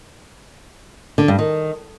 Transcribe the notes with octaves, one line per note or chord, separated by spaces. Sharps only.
D3
G2
D#3